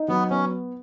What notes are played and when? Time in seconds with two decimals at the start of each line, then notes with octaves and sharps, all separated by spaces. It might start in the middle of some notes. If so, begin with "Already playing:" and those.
Already playing: D#4
0.08 F#3 B3
0.30 B3 C#4